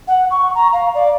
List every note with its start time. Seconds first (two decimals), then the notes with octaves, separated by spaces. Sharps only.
0.08 F#5
0.30 C#6
0.55 A#5
0.73 F5
0.95 D5